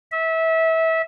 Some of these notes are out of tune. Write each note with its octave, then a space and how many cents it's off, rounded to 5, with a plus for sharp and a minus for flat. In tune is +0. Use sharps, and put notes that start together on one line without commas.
E5 -25